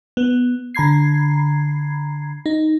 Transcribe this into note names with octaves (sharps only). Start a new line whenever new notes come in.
B3
D3 A#5 B5 G#6 C7
D#4